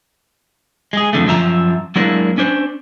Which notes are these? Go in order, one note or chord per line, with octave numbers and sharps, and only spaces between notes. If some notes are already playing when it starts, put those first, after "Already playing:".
G#3 G#4
F2 D3 A3
F#2 F3 E5 A#5
F#3 G#3 A#3 D4 E4 A#4
C#4 D4 C5